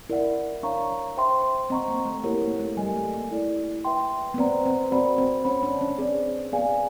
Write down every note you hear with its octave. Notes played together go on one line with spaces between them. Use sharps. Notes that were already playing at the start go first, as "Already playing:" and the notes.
E4 A#4 D5 F#5
D4 A#4 C#5 F5 A#5 C#6
C5 E5 G5 C6
C4 C5 D#5 F#5 A#5 C#6
A#3
A3
A#3 E4 G4 A#4 C#5 F#5
A#3
A3
G3 A#4 D#5 G#5
A3
A#3
E4 A4 D5
B4 E5 G5 C6
B3
C4 B4 D5 F#5 A#5
C4
C4 F#4 A#4 D5 F#5 B5
C4
C#4 C#5 F#5 B5
D4
C#4
C4 G#4 B4 D5
B3 G#4 B4 D5 F5 G#5